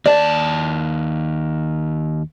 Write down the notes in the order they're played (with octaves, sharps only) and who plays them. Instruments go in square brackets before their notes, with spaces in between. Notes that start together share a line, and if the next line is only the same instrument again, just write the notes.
[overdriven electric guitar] D#2 A5 [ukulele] D5